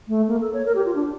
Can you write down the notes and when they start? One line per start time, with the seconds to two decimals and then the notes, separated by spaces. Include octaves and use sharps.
0.08 A3
0.28 A#3
0.41 A4
0.53 C#5
0.66 A#4
0.75 G4
0.85 F4
0.95 D4